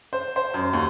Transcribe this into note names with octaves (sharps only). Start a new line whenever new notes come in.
C5
C5
F#2
D#2